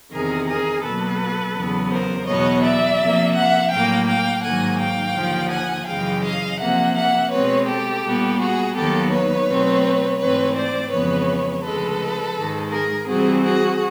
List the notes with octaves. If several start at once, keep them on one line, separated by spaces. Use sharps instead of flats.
E2 C3 D#3 G#4 A#4
G#4 A#4
B2 F#3 A#3 A4 B4
E2 C#3 F#3 B3
A#4 C5
E2 B2 F#3 B3 C#5 D#5
D5 E5
C3 F3 A#3
E5 F#5
A2 F#3 A#3 F5 G5
F5 G5
G#2 D#3 F#3 A#3 F#5 G#5
F5 G5
D#2 D3 F3
F#5 G#5
F#2 C#3 E3 G#3 F5 G5
D#5 F5
C3 F3 A#3 E5 F#5
E5 F#5
B2 G#3 C4 B4 C#5
G4 A4
A#2 G3 B3
F#4 G#4
D#2 D#3 F#3 B3 G4 A4
B4 C#5
B2 F#3 A3 C4
G#2 E3 A3 C4 B4 C#5
C5 D5
F2 C#3 E3 G#3 B3 B4 C#5
D2 C#3 F3 G#3 A4 B4
G#2 D#3 G#3
G#4 A#4
C3 E3 G3 C4 F#4 G#4
F#4 G#4